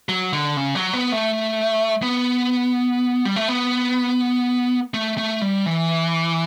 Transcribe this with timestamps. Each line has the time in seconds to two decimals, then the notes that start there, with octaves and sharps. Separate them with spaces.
0.09 F#3
0.33 D3
0.57 C#3
0.75 F#3
0.93 B3
1.12 A3
2.02 B3
3.25 G3
3.36 A3
3.48 B3
4.94 A3
5.17 A3
5.42 G3
5.66 E3